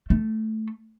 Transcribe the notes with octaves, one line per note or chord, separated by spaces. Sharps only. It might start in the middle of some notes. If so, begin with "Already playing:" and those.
A3